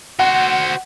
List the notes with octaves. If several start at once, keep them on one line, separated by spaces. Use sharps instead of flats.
F#4 C5 F#5